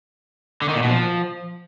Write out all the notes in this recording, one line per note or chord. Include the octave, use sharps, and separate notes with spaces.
D3
D#3
A#2
B2
F3